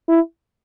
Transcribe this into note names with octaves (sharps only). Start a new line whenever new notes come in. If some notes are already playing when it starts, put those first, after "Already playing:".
E4